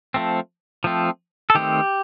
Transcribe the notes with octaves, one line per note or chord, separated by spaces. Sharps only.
F3 A3 C4
F3 A3 C4
A4
D#3 A3 C4 G4